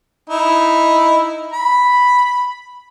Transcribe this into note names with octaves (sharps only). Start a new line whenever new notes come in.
D#4 E4
B5